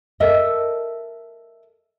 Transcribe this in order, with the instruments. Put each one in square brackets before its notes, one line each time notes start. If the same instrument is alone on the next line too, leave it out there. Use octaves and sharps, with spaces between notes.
[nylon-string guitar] A4 A#4 D#5 E5